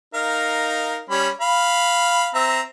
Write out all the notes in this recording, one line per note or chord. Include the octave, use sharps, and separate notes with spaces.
D#4 A#4 F5
G3 C#4 B5
F5 B5
C4 E5 A#5